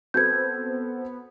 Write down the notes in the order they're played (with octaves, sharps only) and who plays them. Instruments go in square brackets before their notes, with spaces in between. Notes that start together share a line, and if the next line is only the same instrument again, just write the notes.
[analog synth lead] B3 [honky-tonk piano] C4 F#4 A4 [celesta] G6 G#6